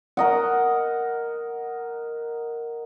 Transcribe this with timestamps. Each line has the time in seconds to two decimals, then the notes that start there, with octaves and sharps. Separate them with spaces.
0.17 A#4 D#5 F#5